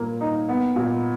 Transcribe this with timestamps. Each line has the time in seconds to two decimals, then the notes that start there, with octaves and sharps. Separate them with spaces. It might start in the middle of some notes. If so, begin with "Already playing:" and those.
Already playing: A#2 A#3
0.21 D#4
0.49 B3
0.76 A#2